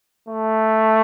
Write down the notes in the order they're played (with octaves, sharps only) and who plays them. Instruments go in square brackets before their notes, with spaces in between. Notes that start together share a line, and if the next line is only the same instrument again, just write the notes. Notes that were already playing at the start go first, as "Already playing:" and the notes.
[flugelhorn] A3